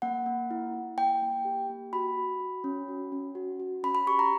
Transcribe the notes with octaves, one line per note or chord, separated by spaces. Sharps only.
A#3 F#5
A#3
E4
E4
A#3 G5
A#3
G4
A#3
F#4 B5
F#4
F#4
C#4
F#4
C#4
F#4
F#4
C#4 B5
B5
G4 C#6
A#5